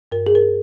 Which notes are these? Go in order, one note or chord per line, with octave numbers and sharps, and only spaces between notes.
G2 A#4
G#4
A#4